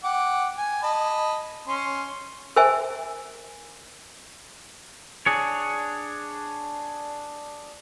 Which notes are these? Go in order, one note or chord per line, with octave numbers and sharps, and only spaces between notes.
F#5 G5 D6
G#5
D#5 A5 B5
C#4 C6
A#4 C5 E5 G#5
D4 G#4 C#5